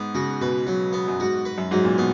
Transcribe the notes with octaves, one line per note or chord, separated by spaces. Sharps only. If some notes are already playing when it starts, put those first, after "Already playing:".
Already playing: G#2 B3
C#3 F#4
B2 B4
F#3
B3
F#2
G#2 F#4
B4
F#2
G#2 F#3
A#2
B2 B3